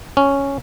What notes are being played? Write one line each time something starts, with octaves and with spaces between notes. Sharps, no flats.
C#4